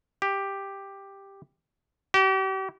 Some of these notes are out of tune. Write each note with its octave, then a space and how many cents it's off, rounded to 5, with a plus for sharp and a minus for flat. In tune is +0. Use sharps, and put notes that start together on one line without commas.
G4 +5
G4 -40